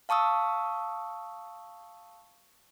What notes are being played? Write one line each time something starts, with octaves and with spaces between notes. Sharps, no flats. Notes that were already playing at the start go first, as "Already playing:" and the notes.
F5 A5 C#6 D#6 E6